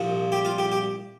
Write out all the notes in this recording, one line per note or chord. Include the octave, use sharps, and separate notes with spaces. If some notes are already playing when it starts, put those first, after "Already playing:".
Already playing: C2 A#2 F3
G4
F4
G4
G4